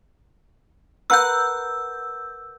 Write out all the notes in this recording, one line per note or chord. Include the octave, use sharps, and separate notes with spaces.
A#4 B4 F#5 E6 G6